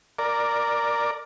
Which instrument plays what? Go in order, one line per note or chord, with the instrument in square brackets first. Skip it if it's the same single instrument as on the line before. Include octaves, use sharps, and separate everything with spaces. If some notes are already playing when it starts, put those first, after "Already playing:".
[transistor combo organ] A#4 D5